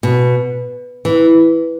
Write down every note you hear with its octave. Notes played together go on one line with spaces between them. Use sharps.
B2
E3